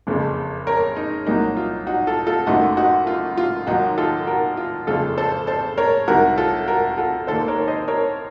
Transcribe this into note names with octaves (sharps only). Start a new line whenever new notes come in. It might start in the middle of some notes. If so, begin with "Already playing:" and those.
F#1 F2 C#3
A#4 C#5
D#4
C2 A#2 F#3 A#3 D#4
F4
D#4 F#4
F4 A4
F4 A4
F#1 F#2 D#3 A3 D#4 F#4
D#4 F#4
F4
F4
D#2 D#3 F#3 D#4 F#4
F4 A4
F#4 A#4
F4
F#1 F2 C#3 F4 A4
A4 C5
A4 C5
A#4 C#5
C2 C3 D#3 F#4 A#4
F4 A4
F#4 A#4
F#4
F4 A4
D#2 D#3 A#3 A4 C5
A#4 C#5
C5 D#5
A#4 C#5